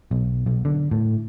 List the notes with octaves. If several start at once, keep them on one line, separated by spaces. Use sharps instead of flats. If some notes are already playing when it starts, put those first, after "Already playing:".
B1
B1
D3
A2